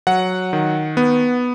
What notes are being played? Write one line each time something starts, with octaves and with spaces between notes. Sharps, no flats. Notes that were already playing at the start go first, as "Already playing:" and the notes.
F#3 F#5
D#3
B3